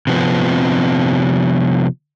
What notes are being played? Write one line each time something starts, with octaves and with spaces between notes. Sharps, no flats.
C3 F3 B3 C4